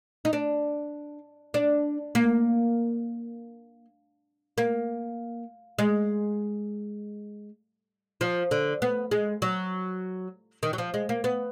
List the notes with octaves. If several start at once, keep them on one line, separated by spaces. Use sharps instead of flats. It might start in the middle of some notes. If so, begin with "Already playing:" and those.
D#4
D4
D4
A#3
A#3
G#3
F3
D3
B3
G#3
F#3
D#3
F#3
F3
G#3
A#3
B3